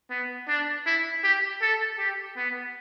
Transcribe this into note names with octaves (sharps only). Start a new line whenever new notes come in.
B3
D4
E4
G4
A4
G4
B3